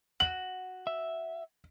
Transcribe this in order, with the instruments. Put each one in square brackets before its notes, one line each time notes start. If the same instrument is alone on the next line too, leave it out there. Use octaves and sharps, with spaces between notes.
[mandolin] F#4 [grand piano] F#7
[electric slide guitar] E5